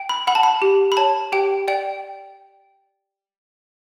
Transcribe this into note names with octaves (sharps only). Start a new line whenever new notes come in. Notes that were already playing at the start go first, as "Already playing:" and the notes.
Already playing: G5
B5
F#5 B5
A5
B5
G4
B5
C#5 A5
G4 G5
D5 G5